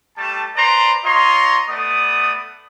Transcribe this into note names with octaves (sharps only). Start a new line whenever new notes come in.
G3 A3 A5
B4 C5 D5 A#5 C6
F4 C#5 D#5 A#5 C6
A3 B3 D5 D#6